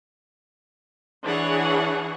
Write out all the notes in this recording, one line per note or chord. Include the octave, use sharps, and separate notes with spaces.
E3 D4 G#4 C#5 F#5